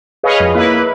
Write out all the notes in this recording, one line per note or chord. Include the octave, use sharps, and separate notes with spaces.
G#4 B4 C#5 D#5 F5
F2
A#3 E4 B4